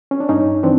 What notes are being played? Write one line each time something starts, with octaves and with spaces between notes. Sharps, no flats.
C#4
D4
G2 C#4 D#4
E3 C4 D4